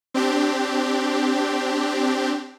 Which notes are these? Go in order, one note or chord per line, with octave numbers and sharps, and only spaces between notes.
C4 D4 G4